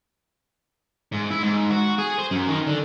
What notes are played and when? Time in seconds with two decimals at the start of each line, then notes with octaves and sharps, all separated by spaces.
1.12 G#2
1.31 E4
1.42 G#2
1.71 F#4
1.99 G#4
2.19 C5
2.31 F#2
2.48 D#3
2.67 D3